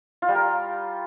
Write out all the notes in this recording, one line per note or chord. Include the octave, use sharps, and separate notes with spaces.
F4
G3
A#4